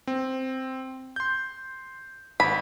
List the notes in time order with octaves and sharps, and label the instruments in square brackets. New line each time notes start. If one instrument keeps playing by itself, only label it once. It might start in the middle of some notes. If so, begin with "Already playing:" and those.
[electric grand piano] C4
C6 G6
[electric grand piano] G#1 [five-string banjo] B5